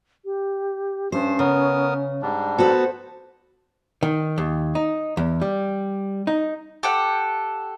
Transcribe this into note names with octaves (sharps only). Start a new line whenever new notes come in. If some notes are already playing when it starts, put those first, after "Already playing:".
G4
G2 C#4 C5
C#3 B3 A#4 D#6
G#2 G3 D4
B3 F#4 A4 C5
D#3
D#2
D#4
E2
G3
D#4
G4 A4 F#5